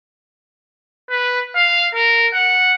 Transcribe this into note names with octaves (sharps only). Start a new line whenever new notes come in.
B4
F5
A#4
F#5